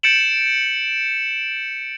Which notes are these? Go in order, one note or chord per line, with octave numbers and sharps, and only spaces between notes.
G6 A6 C#7 D7 E7 F#7